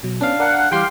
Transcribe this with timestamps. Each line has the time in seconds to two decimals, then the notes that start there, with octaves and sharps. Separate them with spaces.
0.03 B2 F#3
0.21 B3 C#4 D4 F5
0.40 A#4 D5 F#5 A5
0.72 E3 G3 G4 F5 G5 C6 C7